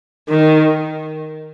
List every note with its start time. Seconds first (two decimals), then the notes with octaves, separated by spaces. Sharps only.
0.29 D#3